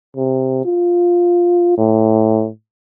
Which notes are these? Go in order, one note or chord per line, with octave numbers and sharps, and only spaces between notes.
C3
F4
A2